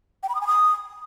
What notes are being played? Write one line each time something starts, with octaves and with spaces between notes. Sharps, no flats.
G5
B5
D#6
G#5
D#6